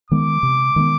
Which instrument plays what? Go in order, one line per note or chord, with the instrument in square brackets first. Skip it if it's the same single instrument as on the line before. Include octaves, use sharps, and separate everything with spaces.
[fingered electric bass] D#3 G#3 B3 [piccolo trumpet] D6
[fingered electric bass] C3
D#3 G#3 B3